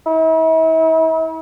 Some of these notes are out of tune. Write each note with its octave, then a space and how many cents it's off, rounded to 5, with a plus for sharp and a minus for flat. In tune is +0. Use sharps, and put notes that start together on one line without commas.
E4 -40